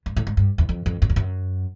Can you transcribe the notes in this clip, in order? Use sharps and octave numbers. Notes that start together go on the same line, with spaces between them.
G2
A2
G#2
G2
E2
F2
F2
F#2
F2
F#2